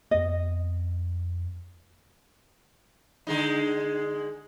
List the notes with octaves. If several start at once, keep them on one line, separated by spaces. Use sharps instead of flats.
F2 B3 D#5
D3 G#3 D#4